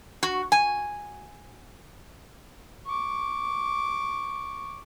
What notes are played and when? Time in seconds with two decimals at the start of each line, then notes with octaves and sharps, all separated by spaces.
0.23 F#4
0.52 G#5
2.86 C#6 D6